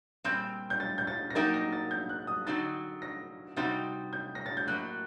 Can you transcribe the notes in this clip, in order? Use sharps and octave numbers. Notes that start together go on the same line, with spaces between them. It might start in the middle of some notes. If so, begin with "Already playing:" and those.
A#2 G3 C4 G6
G6
A6
G6
A6
A#6
F#3 A#3 D#4 G4 A#4 A6
A#6
A6
G6
F#6
D#6
D3 F#3 C4 D#4 A6
A#6
C3 G3 C4 D#4 F#4 A6
G6
A#6
A6
G6
A2 F#3 A#3 F#6